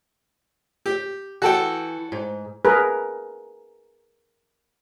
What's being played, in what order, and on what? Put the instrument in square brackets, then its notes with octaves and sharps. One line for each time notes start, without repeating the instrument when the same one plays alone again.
[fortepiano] G4
[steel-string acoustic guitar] E3 [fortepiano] F#4 A4 G5
[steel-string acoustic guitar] G#2
[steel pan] G#4 A#4 B4